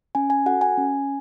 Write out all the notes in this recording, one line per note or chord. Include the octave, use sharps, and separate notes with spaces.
C#4 G#5
G#5
F#4 A4 F#5
G#5
C#4